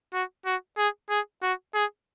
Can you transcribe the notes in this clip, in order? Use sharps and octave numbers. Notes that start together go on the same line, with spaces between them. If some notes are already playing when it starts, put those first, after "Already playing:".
F#4
F#4
G#4
G#4
F#4
G#4